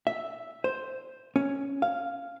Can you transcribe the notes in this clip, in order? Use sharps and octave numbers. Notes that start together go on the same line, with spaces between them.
E5
C5
C#4
F5